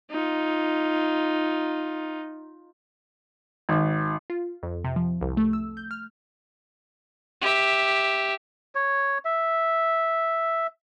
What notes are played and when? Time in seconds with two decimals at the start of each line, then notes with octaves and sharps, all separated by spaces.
0.10 D#4 F4
3.69 G#1
4.30 F4
4.63 F2
4.84 C3
4.96 F3
5.21 C2
5.37 A3
5.53 E6
5.77 G6
5.91 F6
7.41 G4 E5
8.75 C#5
9.25 E5